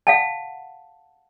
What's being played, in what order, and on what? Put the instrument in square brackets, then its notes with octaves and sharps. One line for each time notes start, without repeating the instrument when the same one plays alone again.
[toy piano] F5 F#5 A5